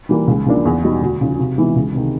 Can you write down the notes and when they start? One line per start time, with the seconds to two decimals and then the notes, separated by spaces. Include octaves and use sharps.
0.09 E3 G3 A#3
0.27 C#2
0.46 C#3 F3 A#3 D4
0.65 E2
0.83 B2 G3 B3 D#4
1.02 D2
1.21 C#3 F3
1.39 C3
1.58 E3 G#3 B3 E4
1.76 C#2
1.94 C3 D#3